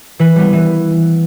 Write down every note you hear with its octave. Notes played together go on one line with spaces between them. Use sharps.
E3 B4
G3 B3
E3